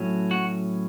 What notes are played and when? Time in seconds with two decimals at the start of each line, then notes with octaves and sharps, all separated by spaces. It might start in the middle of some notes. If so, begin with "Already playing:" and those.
Already playing: A2 F#3 C#4
0.31 F#4